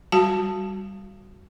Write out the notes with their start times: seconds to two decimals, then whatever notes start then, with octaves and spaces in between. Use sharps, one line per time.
0.12 G3 F#4 A5